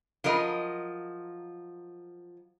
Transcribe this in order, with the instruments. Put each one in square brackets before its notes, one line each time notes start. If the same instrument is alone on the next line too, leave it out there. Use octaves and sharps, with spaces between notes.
[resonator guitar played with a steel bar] F3 F#3 A#4 D#5